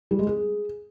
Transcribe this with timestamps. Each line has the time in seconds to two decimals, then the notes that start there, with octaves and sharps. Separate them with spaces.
0.11 G3
0.19 G#3
0.27 G#4